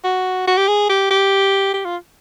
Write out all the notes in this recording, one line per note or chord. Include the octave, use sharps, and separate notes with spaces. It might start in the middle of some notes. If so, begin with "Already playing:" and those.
F#4
F#4
G4
G#4
G4
G4
G4
F4